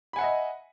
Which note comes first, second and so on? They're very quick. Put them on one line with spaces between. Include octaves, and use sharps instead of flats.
B5 G#5 F#5 E5 D#5